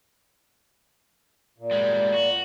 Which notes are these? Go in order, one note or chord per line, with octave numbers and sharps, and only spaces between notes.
A#2
G3 G#3
F#4